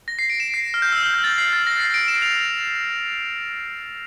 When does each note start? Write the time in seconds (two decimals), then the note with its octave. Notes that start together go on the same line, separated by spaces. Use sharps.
0.08 A#6
0.19 C7
0.30 D7
0.40 E7
0.54 C7
0.74 F6
0.82 G6
0.92 E6
1.03 F6
1.14 G6
1.24 A6
1.38 C7
1.53 A6
1.67 A#6
1.80 C7
1.94 D7
2.08 E7
2.22 F7